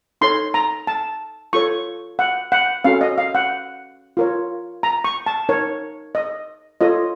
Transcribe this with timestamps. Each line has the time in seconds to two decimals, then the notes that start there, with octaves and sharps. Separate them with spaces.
0.21 D#4 A4 C#5 C6
0.54 A#5
0.87 A5
1.53 F4 A4 C#5 C#6
2.19 F#5
2.52 F#5
2.84 C#4 F#4 A4 C#5 F5
3.01 D#5
3.18 F5
3.35 F#5
4.17 F4 A#4 C#5
4.83 A#5
5.04 C#6
5.26 A5
5.49 D#4 A#4 C#5
6.15 D#5
6.81 F4 A4 C#5 D#5